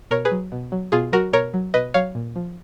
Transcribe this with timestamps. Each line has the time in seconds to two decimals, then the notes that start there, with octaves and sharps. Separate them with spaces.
0.11 B2 A#4 C#5
0.25 G#4 B4
0.31 F#3
0.52 B2
0.72 F#3
0.92 B2 F4 G#4
1.12 F#3 F#4 A#4
1.33 B2 A#4 C#5
1.54 F#3
1.74 B2 B4 D#5
1.94 F#3 C#5 F5
2.15 A#2
2.36 F3